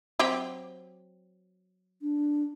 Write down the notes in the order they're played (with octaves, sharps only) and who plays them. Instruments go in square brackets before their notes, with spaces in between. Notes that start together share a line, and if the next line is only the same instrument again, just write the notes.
[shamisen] F#3 C4 G4
[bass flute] D4